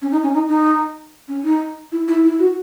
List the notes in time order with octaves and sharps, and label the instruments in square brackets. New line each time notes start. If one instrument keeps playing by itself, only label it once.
[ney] C#4
D#4
C#4
D#4
D#4
C#4
D#4
E4
E4
E4
F#4